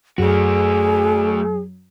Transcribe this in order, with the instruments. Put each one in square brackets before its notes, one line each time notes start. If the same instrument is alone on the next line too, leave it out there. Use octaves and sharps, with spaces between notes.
[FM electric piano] F#2 F#3 [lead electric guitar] A3 F#4 [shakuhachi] G#4